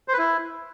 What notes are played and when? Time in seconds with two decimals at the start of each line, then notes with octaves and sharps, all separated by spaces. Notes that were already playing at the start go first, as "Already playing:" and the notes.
0.08 C5
0.13 B4
0.18 E4